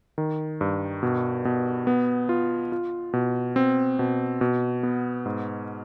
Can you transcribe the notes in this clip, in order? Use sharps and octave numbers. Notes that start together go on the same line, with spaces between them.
D#3
G2
B2
B2
B3
F4
F4
B2
C4
B2
B2
B3
G#2